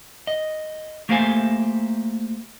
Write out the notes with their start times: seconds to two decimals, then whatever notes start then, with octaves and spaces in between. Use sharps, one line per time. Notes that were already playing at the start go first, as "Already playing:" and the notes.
0.27 D#5
1.09 A3 A#3 G4 C5 F5 G#5